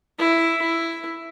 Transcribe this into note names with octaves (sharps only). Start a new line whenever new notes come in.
E4
E4